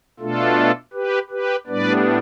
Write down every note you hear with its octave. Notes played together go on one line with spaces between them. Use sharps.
B2 A3 D4 F4 A4
G4 B4
G4 B4
A2 G3 B3 D4 B4 D5